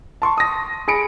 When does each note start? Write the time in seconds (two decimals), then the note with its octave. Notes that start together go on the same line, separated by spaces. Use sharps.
0.22 A5 C6 C#6
0.38 D#6 A#6
0.88 G#4 B5 C#7 D7